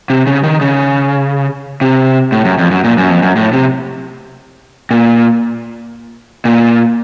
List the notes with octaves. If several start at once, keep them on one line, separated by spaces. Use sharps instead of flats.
C3
C#3
D#3
C#3
C3
A2
F#2
F2
F#2
A#2
F#2
F2
F#2
A2
C3
A#2
A#2